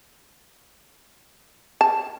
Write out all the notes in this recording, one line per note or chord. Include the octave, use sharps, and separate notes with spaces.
A5